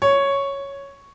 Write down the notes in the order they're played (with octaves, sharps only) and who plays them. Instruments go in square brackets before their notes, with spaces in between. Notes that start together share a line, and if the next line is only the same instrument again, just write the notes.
[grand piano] C#5